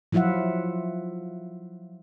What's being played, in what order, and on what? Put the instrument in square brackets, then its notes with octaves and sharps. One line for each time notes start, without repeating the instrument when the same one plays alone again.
[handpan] F3 F#3 E4 F4 E5 F#5